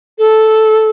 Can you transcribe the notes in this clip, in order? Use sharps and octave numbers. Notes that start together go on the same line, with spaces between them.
A4